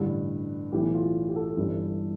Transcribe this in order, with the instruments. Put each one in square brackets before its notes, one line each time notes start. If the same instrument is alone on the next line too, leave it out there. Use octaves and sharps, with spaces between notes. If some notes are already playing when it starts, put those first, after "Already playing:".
Already playing: [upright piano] A1 G2 D3 G3
B1 A2 E3 G4
F4
G4
A4
G1 G2 E3 G3